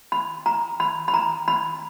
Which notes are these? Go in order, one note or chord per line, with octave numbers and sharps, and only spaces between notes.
B5
A#5
B5
B5
A#5
B5